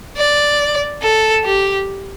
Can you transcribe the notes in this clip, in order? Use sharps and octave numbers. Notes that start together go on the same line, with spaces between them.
D5
A4
G4